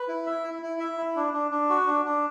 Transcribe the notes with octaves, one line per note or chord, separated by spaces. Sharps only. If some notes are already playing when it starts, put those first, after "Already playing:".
Already playing: B4
E4
E5
E4
E4
E5
E4
D4
D4
D4
F#4
D4
D4